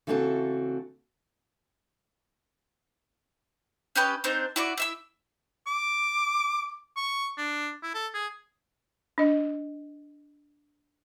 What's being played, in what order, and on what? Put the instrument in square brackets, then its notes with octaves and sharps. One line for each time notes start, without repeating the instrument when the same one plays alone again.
[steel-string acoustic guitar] C#3 E3 A3 C4 F#4 A4
[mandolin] C#4 G4 B4 D#5
C4 D4 D#4 C5
E4 F#4 D5
E4 E5 E6
[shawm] D6
C#6
D4
E4
A4
G#4
[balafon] D4 D#5